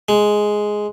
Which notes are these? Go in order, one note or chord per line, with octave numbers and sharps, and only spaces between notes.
G#3